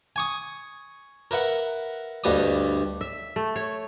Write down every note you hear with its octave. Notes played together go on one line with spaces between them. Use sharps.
G#5 C#6 D#6
A#4 B4 E5 F#5
D2 G2 G3 B4 D#5 D#6
E5
A3
C#5